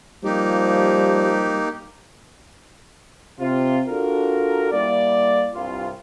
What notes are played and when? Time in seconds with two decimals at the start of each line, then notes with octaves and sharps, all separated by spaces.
0.24 F3 G3 A#3 D#4 G4
3.41 C3 C4 F4
3.87 D4 F4 F#4 A4 A#4
4.72 G3 A#3 E4 D5
5.55 C2 G2 F4